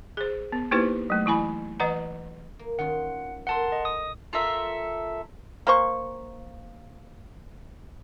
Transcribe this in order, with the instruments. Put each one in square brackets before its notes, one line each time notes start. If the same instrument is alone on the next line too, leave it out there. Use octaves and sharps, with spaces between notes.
[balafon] G#4 C5
B3
A#3 D#4 E4 G4 B4 C5
F#3 A3
E3 E4 G#5 B5
E3 B4 D#5 F#5 A#5
[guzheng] A#3
[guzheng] D#3 C#4 F4 [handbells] F#5
[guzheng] A4 A#4 C5 [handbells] F#5 A5 C6
[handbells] D#5
D#6
[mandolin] F4 A4 A#4 E5
[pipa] A#3 C5 C#6